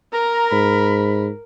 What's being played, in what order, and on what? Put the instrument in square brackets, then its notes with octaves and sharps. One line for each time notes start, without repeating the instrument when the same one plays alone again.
[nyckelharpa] A#4 [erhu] A#5
[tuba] G#2 [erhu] B5